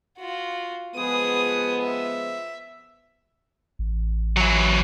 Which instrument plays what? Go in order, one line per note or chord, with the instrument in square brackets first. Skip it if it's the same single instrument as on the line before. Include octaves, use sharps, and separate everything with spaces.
[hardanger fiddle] F4 F#4
[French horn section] F3 G#3 B3 [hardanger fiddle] G#4 D#6
[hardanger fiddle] E5
[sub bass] A1
[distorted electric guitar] E3 F#3